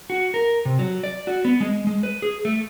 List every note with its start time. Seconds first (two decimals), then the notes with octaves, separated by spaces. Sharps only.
0.10 F#4
0.34 A#4
0.65 C3
0.79 F#3
1.04 D5
1.27 F#4
1.45 B3
1.61 G#3
1.87 G#3
2.03 B4
2.22 G#4
2.45 A3